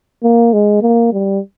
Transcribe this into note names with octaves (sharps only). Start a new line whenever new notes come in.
A#3
G#3
A#3
G3